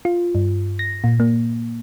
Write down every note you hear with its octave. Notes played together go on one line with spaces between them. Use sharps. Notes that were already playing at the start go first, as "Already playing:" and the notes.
F4
G2
A#6
A#2
A#3